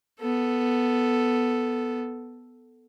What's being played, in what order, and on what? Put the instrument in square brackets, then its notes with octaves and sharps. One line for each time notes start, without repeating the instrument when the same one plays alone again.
[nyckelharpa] B3 A4